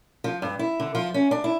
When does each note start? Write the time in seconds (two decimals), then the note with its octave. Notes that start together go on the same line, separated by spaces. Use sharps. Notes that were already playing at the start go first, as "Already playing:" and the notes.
0.24 F3
0.42 G2
0.59 E4
0.80 D3
0.95 F3
1.14 C#4
1.31 D4
1.44 E4